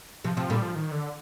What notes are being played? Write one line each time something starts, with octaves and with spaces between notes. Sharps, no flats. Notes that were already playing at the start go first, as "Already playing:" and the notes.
C3 F3
C3 F3
A#2 D3 G3
F3
D#3
D3